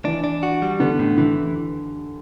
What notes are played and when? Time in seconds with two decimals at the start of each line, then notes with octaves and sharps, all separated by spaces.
0.05 E3 D4
0.24 D4
0.43 F#4
0.62 G3
0.80 D3 B3
0.99 A2
1.18 D3 E3